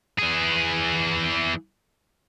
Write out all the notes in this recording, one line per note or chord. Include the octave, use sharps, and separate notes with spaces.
E3 G#4